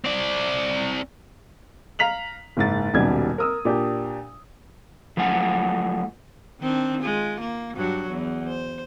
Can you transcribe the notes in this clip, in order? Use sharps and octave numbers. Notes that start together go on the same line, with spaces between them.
C4 D5
F5 A#5 B6 F7 F#7
F#1 G#2 A6
D#1 B1 C#3 F#3 G3 G#6
A#4 D#6 E6
A#2 D4 G4
F3 F#3 A3 F#5 G#5
D#3 C4 D4
G#3 F4
A#3
G2 F#3 F#4
E2
C5